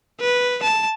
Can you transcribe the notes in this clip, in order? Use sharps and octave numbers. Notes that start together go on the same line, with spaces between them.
B4
A5